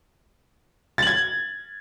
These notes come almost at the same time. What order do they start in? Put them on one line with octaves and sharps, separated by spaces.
A6 F#7 G#6